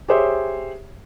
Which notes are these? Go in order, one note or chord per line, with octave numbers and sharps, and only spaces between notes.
G4 G#4 C5 C#5 E5